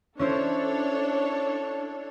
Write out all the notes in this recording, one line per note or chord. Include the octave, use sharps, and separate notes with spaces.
C#4 D4 E4 A4 C5 C#5